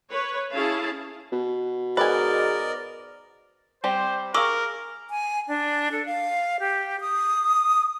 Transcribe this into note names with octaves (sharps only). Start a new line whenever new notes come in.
B4 C#5
C#4 E4 G#4 F5 A5
B2
G#2 A#4 B4 D5 D#5 G#5
G3 C4 G4 C5
G#4 A#4 F5 C#6 D6 E6
G#5
D4
A4
F5
G4
D#6